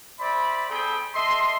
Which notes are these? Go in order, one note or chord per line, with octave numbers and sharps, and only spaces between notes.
C5 D5 E5 B5
C4 G#4 A4 G5 B5
A4 D#5 E5 C6